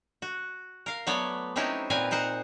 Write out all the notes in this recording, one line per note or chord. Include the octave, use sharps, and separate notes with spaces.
F#4
A#4 F5
F#3 A3 B3 C#5 D5
F#3 C4 C#4 D#4 E4
A#2 C4 A#4 B4 G#5
D#4 A#4 C5 F#5